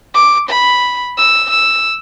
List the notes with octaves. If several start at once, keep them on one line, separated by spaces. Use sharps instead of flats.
D6
B5
E6
E6